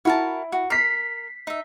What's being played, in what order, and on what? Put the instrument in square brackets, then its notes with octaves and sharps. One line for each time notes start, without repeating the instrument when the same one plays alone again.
[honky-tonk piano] E4 [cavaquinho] F#4 A#4 A5
[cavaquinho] F#4
[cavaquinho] A#4 [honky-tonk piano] B6 C7
[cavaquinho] D#4 E5